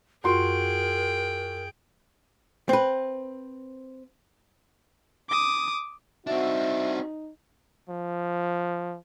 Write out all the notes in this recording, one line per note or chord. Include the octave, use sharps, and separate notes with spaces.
F#2 F4 F#4 G#4 A#4 G5 C6
C4 B4
D6 D#6
C4 D4 D#4 F#4 E5
F3